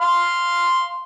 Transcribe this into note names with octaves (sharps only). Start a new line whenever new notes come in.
F5 C6